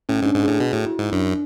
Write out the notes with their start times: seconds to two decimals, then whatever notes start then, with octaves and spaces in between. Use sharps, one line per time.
0.09 A2 C#4
0.22 G#2 D4
0.35 G#2
0.43 A2 G#4
0.60 B2 F#4
0.73 A2
0.86 E4
0.99 G#2
1.12 F#2 D4